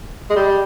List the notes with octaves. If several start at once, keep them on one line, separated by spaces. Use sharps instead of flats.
G#3
G3